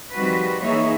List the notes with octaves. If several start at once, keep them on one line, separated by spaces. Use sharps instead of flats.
D#3 F3 G3 C4 F#4 B4
E3 A#3 D#4 G#4 C#5 E5